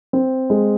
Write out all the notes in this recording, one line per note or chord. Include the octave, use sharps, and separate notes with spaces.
C4
G#3